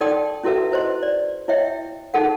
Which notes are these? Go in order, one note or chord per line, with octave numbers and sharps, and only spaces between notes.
D#4 A4 D5 G5 C6 D#6
C#4 E4 F#4 A4 B4 E5
E4 B4 C5 D#5 C6
D5
E4 C#5 D#5 E5 G5
D#4 G#4 A4 F#5